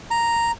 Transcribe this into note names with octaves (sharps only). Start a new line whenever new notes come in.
A#5